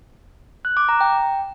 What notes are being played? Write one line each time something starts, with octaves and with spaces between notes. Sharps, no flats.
F#6
D6
A#5
G5